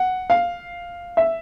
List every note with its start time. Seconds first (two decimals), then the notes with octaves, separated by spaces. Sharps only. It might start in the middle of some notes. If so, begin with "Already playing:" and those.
Already playing: F#5
0.30 F5
1.17 E5